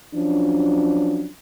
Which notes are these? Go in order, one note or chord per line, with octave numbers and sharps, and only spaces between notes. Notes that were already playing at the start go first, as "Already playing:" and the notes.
F3 F#3 C#4 D4